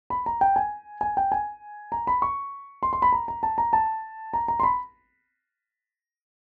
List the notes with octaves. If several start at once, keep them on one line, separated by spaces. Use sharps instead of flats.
B5
A#5
G5
G#5
G#5
G5
G#5
A#5
B5
C#6
C6
C6
B5
A#5
A#5
A5
A#5
A5
A#5
A#5
C6
B5